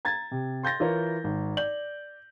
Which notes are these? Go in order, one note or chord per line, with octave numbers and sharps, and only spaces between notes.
A#5 G#6 A6
C3
C6 G6 A6 A#6
E3 E4 F4 A#4 B4 C#5
G#1
D5 G6 F#7